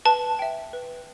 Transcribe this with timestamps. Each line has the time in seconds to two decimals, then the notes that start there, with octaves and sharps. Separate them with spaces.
0.05 B4 A5
0.39 E5 G5
0.73 B4